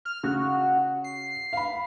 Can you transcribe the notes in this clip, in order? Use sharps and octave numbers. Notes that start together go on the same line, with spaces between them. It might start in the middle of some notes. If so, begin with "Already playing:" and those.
F6
C#3 F#4
C7
F5 B5